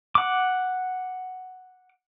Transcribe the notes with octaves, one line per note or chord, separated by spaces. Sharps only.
F#5 D6